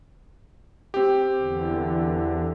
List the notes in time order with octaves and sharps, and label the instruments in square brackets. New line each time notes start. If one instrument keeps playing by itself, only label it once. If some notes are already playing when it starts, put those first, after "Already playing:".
[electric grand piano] C4 G4
[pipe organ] E2 D3